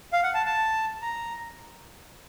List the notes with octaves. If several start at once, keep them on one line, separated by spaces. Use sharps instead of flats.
F5
F#5
A5
A5
A#5